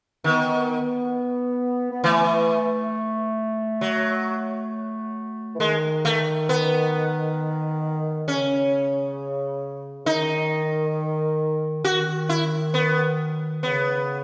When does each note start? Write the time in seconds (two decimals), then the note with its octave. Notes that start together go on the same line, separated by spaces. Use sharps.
0.24 D#3 B3
1.91 B3
2.03 E3 A3
3.81 F#3
5.56 E3
5.60 D#3 G#3
6.05 A3
6.49 B3
8.27 C#3 C#4
10.06 D#3 D#4
11.84 D#3 F#4
12.29 E4
12.74 B3
13.63 C#3 B3